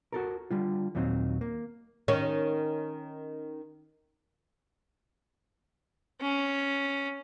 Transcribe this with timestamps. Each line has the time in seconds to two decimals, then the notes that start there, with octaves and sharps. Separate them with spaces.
0.12 F#4 A4 A#4
0.51 D3 G3 F4
0.95 D#2 A#2 F#3 C4 D#4
1.41 A#3
2.08 D#3 C#4
6.21 C#4